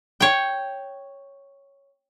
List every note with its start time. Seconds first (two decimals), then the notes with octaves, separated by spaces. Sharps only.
0.20 C#5 G5